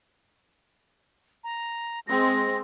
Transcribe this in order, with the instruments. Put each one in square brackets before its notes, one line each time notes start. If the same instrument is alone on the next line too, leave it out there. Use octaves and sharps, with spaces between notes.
[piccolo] A#5
[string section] G#3 C4 [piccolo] A#6